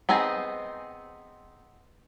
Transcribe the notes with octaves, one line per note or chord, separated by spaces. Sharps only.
B3 C4 D#4 G#4 G#5